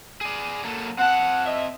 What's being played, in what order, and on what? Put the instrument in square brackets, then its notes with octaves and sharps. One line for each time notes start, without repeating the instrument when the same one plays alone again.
[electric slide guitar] G#4 D5
F#3 A#3 A4
[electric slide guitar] C4 A5 [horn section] F#5
[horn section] D#5 E5